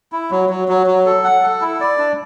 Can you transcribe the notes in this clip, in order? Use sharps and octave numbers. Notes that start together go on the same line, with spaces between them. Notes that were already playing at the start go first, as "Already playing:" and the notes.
E4
F#3
F#3
F#3
F#3
A4
F#5
A4
E4
D5
D4